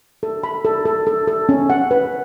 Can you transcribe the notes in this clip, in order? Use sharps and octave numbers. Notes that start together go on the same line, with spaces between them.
A4
B5
A4
A4
A4
A4
C#4
F#5
B4